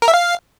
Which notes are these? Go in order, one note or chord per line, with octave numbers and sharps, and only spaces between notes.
A#4
E5
F5